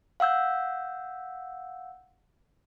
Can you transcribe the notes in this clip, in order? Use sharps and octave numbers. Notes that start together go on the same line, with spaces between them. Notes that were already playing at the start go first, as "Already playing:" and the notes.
F5 F#5 E6 G6